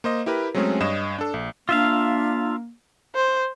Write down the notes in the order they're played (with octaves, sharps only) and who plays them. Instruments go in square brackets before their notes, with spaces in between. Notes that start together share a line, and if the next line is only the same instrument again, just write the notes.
[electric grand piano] A#3 C5 D#5
E4 G4 A#4 B4
F#3 G#3 A3 C4 C#4 G#4
G2 C#5 D#5 E7
D4 A4
A#1
[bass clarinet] A#3 [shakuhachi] D4 [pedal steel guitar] F4 E5 F5
[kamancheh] C5